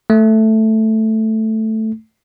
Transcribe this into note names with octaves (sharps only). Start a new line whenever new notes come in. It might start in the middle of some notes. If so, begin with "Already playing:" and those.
A3